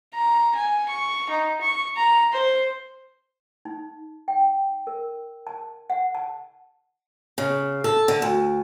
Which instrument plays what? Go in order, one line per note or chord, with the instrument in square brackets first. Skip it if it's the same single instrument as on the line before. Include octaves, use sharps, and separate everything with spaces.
[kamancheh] A#5
G#5
C#6
D#4
C#6
A#5
C5
[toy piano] D#4
G5
A#4
A5
F#5
A5
[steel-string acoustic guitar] C#3
A4
D3
D2